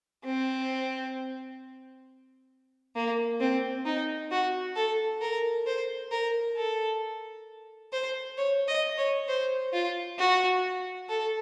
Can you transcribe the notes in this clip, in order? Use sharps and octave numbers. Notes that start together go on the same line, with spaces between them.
C4
A#3
C4
D#4
F#4
A4
A#4
C5
A#4
A4
C5
C#5
D#5
C#5
C5
F4
F#4
A4